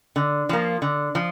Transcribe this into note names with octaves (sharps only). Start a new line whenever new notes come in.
D3
F3 A#3
D3
F3